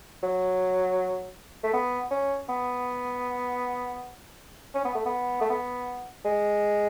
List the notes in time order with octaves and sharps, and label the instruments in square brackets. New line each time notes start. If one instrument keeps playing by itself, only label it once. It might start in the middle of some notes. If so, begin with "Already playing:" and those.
[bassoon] F#3
A3
B3
C#4
B3
C#4
B3
A3
B3
A3
B3
G#3